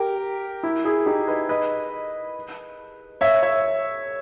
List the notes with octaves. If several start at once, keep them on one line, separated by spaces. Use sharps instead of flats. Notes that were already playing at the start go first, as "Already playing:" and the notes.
Already playing: G4 A#4
E4
E4 G#4
D#4 G4
B4 D#5
B4 D#5
C#5 E5
C#5 E5